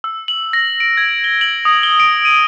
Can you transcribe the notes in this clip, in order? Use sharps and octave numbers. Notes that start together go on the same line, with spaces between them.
E6
F#7
A#6
D7
G#6
G7
F#7
D#6
G7
D7
D#7